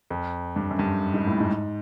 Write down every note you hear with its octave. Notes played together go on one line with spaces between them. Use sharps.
F2
G2
F#2
G2
G#2
A2
G#2